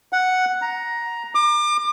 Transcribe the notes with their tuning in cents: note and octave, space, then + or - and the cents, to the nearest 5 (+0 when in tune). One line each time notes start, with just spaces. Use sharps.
F#5 +0
A#5 +10
D6 +35